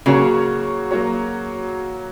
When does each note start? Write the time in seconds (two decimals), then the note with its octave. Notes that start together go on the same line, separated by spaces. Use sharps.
0.06 C#3 F#3 A#3 F#4 C#5
0.91 F#3 A#3 F#4 C#5